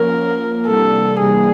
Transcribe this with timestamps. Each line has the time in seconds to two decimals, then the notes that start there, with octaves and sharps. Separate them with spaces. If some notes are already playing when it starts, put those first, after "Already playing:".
Already playing: F3 A#3 C#4 A#4
0.15 F3 A#3 C#4
0.67 C3 E3 G3 A#3 D4 A4
1.20 C3 E3 G3 A#3 D4 G#4